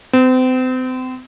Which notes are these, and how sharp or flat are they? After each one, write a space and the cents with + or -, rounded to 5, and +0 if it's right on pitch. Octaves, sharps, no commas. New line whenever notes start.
C4 -35